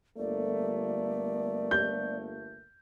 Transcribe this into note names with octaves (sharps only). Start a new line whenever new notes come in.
G1 A3 A#3 D5
G6